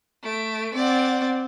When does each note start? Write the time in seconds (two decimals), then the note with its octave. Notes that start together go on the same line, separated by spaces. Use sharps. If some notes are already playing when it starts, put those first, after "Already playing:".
0.22 A3 D7
0.75 C4 D5 F#5